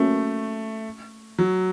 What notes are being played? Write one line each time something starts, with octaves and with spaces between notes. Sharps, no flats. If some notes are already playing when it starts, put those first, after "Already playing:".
Already playing: A3 A#3 C#4 F#4
F#3